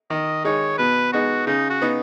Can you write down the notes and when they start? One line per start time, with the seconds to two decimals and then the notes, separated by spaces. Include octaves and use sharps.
0.10 D#3 D#5
0.44 G#3 D#4 C#5
0.78 B2 B4
1.13 G#3 B3 D#4 F#4
1.47 C#3 D#4
1.70 F#4
1.82 B3 D#4